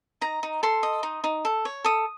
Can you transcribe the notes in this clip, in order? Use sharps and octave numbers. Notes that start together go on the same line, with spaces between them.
D#4 A#5
D#4
A4 C6
D#5
D#4
D#4
A4
C#5
A4 D#6